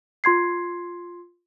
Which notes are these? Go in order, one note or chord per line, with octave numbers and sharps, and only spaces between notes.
F4 C6 G#6 C7